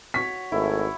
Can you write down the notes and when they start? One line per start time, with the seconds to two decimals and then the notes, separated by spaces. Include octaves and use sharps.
0.14 F#4 C#5 B6
0.52 G#1 A3 E4